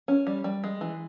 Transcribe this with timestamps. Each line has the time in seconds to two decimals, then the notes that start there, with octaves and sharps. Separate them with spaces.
0.08 C#4
0.27 G3
0.44 G3
0.64 G#3
0.81 E3